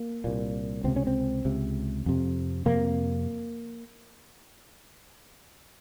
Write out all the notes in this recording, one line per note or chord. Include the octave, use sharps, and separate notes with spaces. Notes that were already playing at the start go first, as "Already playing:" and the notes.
Already playing: A#3
C2 A#2
C#2 C3 C4
C#4
C4
C#2 C3
F2 C3
F2 C3 A#3